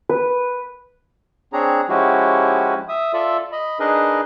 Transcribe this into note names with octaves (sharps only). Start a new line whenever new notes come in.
B4
C4 D4 G#4 C#5 A#5
F3 G#3 C#4 E4 F#4 G4
E5 D#6
F4 A4 D5 E5
D#5 B5
D4 D#4 G#4 A#4 B4 D#5